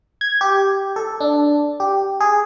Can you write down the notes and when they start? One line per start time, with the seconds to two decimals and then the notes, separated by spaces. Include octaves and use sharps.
0.21 G#6
0.41 G4
0.96 A4
1.20 D4
1.80 G4
2.20 G#4